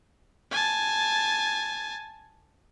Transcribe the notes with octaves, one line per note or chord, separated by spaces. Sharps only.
G#5 A5